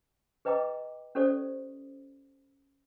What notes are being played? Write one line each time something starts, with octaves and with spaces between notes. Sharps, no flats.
G#4 B4 D#5 G5 A#5 D6
C#4 G4 A4 C5 D5 D#6